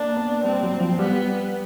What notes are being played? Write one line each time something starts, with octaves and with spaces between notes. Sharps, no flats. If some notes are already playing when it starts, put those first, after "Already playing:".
Already playing: A#3 D4
B3
G3 C4
F#3
F3
G3 B3